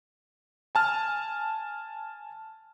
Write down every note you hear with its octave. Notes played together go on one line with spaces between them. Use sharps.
G#5 A5 F6